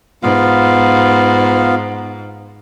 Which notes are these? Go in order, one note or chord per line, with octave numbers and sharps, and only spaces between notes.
G#2 B3 F4 F5